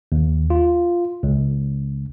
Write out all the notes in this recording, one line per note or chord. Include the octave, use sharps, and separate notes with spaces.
D#2
F4
C#2